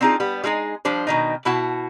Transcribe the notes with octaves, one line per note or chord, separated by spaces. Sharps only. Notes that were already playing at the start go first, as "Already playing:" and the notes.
C4 D4 D#4 F4 G#4
G3 B3
G3 G#3 D#4 G#4
F3 G3 D4 C5
B2 D#3 D#4
B2 E4 F#4 A5